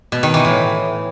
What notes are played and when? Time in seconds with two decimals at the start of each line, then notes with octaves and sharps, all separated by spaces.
0.12 B2
0.23 D#3
0.34 E3
0.45 A2